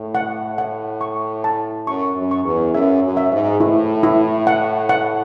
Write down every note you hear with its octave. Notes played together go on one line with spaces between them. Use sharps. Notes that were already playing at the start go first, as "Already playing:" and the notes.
Already playing: A2
F#5
F#5
C#6
A5
F#2 C#6
F#2
C#6
E2
F#2 E5
F#2
E5
G#2
A2 E4
E4
F#5
F#5